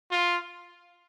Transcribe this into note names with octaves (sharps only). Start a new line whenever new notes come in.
F4